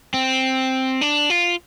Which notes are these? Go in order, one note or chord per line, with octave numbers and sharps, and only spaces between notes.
C4
D4
F4